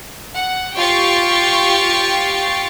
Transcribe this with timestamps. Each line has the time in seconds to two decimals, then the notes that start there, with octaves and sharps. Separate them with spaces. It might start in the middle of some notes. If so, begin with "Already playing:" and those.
0.35 F#5
0.76 F4 G4 G5 C#6 A6 C7